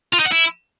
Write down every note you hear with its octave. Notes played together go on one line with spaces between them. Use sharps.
F4
D#4
F#5
E4